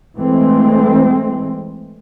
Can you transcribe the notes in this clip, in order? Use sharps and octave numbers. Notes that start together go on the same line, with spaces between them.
E3 G#3 A3 C4